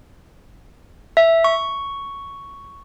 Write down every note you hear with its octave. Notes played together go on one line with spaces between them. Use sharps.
E5
C#6